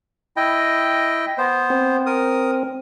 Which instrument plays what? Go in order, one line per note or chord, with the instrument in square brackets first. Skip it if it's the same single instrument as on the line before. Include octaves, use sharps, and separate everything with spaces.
[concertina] E4 D#5 G5
B3 C5
[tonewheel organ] C4
[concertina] A#4 D#6